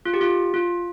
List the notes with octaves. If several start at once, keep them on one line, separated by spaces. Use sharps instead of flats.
F4
G4
F4
F4